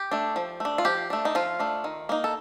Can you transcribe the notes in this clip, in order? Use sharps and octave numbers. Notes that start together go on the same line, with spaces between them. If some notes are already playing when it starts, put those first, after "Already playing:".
Already playing: G4
A3 D4
F3
A3 D4
F4
F3 G4
A3 D4
D#4
F3 F4
A3 D4
D#3
A#3 D#4
A4